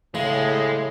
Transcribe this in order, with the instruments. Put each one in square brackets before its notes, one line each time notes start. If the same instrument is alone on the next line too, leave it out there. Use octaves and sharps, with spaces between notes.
[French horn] A2 [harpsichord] C#3 [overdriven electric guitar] G#3